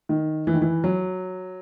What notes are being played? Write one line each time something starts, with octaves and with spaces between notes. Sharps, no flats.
D#3
E3
D#3
E3
F#3